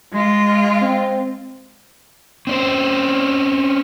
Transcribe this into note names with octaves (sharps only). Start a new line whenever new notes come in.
G#3 F4
C4
C4 C#4 C5